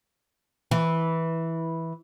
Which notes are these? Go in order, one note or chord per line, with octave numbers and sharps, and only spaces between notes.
E3